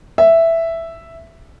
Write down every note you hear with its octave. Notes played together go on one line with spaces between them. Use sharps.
E5